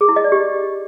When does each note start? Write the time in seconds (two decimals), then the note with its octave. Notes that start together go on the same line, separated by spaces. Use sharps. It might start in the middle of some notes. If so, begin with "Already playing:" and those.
0.01 G#4
0.09 E4
0.16 D#5
0.24 D5
0.32 G4